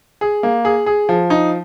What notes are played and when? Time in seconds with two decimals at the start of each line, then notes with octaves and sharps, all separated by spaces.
0.21 G#4
0.43 A#3
0.65 G#4
0.86 G#4
1.09 F3
1.30 D#4